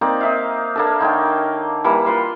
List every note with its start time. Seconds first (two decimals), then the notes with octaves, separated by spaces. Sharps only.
0.01 A#3 C4 D#4 D5
0.21 D#4 E5 F5
0.76 A#3 D4 A4
1.00 D3 D#4 C#5 G5
1.84 E3 G3 A#3
2.06 F4 B4 C6